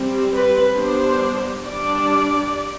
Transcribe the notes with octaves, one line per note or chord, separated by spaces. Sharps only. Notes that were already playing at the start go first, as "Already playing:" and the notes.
Already playing: G3 C4
B4
G3 B3 D4 C5
G3 D4 D5